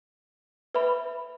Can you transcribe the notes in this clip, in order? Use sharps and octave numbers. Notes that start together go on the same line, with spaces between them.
B4 E5 B5